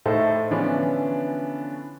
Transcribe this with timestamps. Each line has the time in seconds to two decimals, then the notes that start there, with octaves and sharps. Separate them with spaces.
0.06 A2 A3 D#4 A4 C5
0.50 D3 E3 F3 B3 C#4 D4